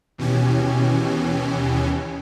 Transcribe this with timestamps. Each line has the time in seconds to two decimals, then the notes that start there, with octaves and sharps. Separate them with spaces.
0.18 D#2 B2 E3 C#4 G4 G#5